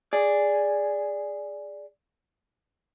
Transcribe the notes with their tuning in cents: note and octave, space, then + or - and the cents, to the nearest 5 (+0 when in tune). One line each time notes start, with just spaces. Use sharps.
G#4 -5 D5 +0